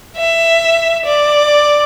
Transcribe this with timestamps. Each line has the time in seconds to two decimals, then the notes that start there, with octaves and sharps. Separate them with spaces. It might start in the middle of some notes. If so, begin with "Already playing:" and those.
0.17 E5
1.06 D5